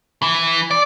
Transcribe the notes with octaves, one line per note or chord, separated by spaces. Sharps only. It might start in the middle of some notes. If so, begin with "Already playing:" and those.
E3
D5